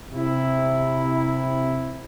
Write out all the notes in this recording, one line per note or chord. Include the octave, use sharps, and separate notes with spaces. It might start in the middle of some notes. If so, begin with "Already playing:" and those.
C3 E4